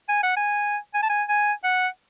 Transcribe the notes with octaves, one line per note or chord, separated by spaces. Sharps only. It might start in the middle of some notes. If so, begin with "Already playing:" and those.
G#5
F#5
G#5
G#5
A5
G#5
G#5
F#5